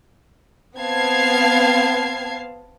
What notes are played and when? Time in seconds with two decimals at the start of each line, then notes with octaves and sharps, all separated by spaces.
0.77 B3 C4 F5 A5 G#6 C7